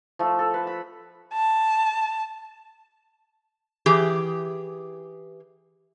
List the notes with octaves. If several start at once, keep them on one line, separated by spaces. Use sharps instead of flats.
F3 A3
A4
B4
B5
A5
E3 G4 G#4